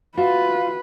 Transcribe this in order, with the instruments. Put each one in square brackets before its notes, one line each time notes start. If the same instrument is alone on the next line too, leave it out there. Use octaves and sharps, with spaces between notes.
[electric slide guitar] F4 [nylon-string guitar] F#4 E5 [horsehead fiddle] B4